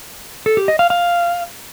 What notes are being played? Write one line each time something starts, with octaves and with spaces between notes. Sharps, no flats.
A4
G4
D#5
F5
F5